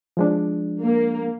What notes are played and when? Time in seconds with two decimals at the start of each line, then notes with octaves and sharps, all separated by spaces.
0.17 F3 G#3 D4
0.81 A#3